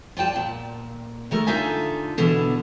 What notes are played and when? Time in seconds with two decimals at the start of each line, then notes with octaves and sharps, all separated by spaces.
0.17 F4 D5 G5 A5
0.36 A#2
1.31 D#3 A3 A#4
1.47 D3 D#4 F4 A4 E5 G#5
2.17 B2 D3 E3